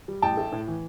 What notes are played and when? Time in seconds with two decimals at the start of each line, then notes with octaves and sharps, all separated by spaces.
0.08 G3
0.22 A1 G5 A5
0.37 A3
0.52 A2
0.68 E3